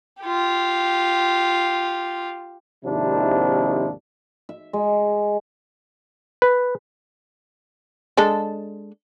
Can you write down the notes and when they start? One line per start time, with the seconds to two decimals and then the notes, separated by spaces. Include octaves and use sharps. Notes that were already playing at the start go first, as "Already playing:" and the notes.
0.22 F4 G4
2.84 G#1 D#2 C3 F3 D4 E4
4.49 E5
4.73 G#3
6.42 B4
8.17 G#3 D4 A4